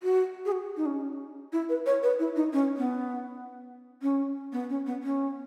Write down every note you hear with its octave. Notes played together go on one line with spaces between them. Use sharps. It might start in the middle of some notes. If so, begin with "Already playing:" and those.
F#4
G#4
F#4
D#4
C#4
E4
B4
C#5
B4
E4
D#4
C#4
B3
C#4
B3
C#4
B3
C#4